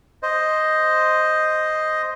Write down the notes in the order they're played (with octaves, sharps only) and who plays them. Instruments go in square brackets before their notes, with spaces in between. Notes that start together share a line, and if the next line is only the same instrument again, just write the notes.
[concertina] C5 D#5